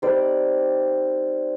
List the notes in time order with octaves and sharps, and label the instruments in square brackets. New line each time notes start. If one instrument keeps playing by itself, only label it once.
[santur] G3 C4 D#4 C5 D5